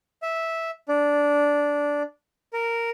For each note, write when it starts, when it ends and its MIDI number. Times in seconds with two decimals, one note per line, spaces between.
0.22 0.70 76
0.88 2.02 62
2.53 2.90 70